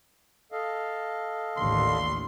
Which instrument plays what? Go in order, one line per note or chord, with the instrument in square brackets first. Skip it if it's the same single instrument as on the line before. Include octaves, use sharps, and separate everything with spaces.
[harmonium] A4 D#5 F5
[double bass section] A1 D#2 D3 [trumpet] C6